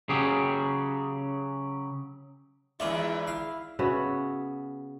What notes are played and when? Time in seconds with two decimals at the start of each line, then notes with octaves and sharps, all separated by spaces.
0.09 C#3 F#3 G4 G#4
2.80 E2 G#3 D4 E4 F4 E5
3.27 F5
3.79 C#3 B3 F#4 E5